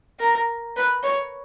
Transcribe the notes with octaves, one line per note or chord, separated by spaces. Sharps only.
A#4
B4
C#5